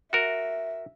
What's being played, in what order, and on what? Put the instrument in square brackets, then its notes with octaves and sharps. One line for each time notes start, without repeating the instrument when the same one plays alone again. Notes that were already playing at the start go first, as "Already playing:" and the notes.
[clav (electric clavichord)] F#4 A#4 [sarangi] E5